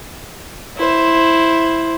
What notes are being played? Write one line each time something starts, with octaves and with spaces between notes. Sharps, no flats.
E4 C5